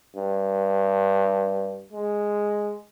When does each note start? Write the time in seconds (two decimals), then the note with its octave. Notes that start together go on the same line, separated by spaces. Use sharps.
0.16 G2
1.92 G#3